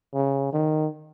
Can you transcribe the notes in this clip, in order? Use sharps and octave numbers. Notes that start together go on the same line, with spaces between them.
C#3
D#3